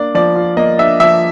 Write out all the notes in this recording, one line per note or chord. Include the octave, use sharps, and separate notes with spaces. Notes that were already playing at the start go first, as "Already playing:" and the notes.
Already playing: A#3 D4 D5
F3 D5
F4
A#3 D#5
D4 E5
F3 E5